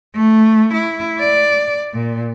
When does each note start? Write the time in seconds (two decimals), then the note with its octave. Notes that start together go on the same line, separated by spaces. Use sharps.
0.16 A3
0.74 E4
1.19 D5
1.94 A#2